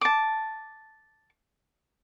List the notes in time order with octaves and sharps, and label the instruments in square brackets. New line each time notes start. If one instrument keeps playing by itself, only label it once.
[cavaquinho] A5 D6